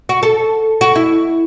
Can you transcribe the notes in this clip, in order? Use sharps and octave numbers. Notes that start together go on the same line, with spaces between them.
F#4
A4
F#4
E4